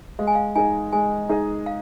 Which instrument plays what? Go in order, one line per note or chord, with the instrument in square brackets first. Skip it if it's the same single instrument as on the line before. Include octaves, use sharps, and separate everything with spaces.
[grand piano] G#3 [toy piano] F5
[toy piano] G#5
F5
[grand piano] D#4 G#4 D#5 [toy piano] G#5
[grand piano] G#3 [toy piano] G#5
[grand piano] D#4 G#4 D#5
[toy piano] F5